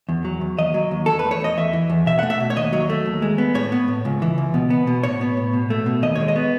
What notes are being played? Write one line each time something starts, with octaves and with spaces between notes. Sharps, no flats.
E2
F#3
E2
D#2 D#5
F#3
D#2
E2 A4
B4
A3
C#5
E2 D#5
E2 E5
E3
E2
B2 E5
A3 F#5
E5
B2
C#5
D#2 D#5
F#3
A3
D#2
G#3
B3
A2 C#5
B3
A2
C#2
E3
C#2
B2
B3
B2
A2 C#5
B3
A2
B2
A3
B2
D#2 D#5
G#3 C#5
D#5
B3